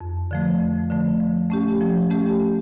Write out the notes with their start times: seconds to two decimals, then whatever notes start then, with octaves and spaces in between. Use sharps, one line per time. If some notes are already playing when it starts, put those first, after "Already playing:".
0.01 F2
0.31 D3 F3 A3
0.60 F2
0.90 D3 F3 A3
1.20 F3
1.50 A3 C#4 G4
1.81 F3
2.10 A3 C#4 G4